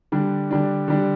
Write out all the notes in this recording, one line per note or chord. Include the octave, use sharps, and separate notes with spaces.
D3 G3 D4
D3 G3 D4
D3 G3 D4